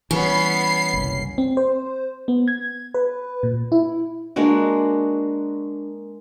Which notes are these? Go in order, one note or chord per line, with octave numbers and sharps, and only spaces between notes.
E3 G3 B3 C#4 B5 C7
F#1 C2
C4
C5
B3
G#6
B4
A#2
E4
G#3 A#3 D4 F#4